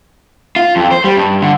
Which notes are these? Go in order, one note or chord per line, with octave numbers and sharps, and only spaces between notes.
F4
F2
C5
G3
G2
D3